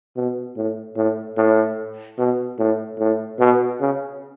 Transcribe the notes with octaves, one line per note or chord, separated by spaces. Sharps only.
B2
A2
A2
A2
B2
A2
A2
B2
C#3